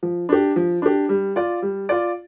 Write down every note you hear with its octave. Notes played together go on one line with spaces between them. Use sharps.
F3
D4 G4
F3
D4 G4
G3
F4 D5
G3
F4 D5